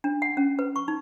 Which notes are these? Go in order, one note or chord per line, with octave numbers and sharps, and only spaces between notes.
D4
F#5
C#4
B4
C#6
D#4